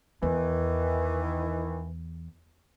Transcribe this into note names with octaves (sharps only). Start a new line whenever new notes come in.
E2 D#3 E3